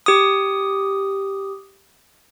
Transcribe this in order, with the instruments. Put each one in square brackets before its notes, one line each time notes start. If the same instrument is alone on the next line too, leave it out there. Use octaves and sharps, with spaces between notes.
[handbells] G4 D#6